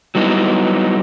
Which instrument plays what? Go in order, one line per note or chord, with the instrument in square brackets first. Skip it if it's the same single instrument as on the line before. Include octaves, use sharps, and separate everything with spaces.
[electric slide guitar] F#3 G3 B3 D#4 E4